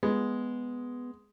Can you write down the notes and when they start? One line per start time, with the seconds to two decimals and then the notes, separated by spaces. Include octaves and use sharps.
0.03 G#3 B3